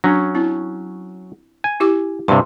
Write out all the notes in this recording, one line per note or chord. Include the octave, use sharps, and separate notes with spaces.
F#3 C#4 D4
C4 E4
G#5
E4 G4 D6
G2 C3 C6